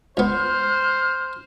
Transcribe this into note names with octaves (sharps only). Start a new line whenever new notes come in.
C#2 B3 C5 F6